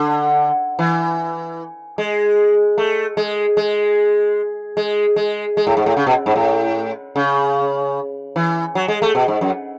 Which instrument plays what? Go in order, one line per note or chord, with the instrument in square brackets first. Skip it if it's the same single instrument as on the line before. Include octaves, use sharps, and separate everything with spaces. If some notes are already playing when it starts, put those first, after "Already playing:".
Already playing: [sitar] D3
E3
G#3
A3
G#3
G#3
G#3
G#3
G#3
A2
G#2
A2
C#3
B2
G#2
A2
C#3
E3
F#3
G#3
A3
B2
G#2
F#2